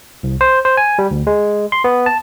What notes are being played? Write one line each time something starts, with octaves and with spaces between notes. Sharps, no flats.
C2
C5
C5
G#5
G3
D2
G#3
C6
B3
A5